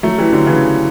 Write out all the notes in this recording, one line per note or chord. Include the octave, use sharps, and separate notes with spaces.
F#3 A3
E3 G3
D3 F#3
C#3 E3